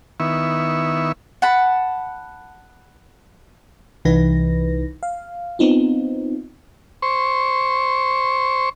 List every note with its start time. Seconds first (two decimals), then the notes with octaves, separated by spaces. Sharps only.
0.20 D#3 B3 E4 E5 C#6
1.42 F#5 A5 B5
4.05 C2 E3 D#4 B4 A#6
5.03 F5
5.59 B3 C4 D#4 F4
7.02 C5 C#6